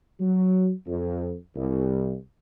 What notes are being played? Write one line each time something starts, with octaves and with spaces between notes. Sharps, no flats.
F#3
F2
C2